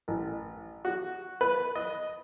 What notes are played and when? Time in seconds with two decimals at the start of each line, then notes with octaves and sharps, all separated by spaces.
0.08 A1
0.85 F#4
1.41 B4
1.75 D#5